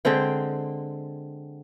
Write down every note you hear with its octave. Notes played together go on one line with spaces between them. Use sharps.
D3 G#3 C4 G5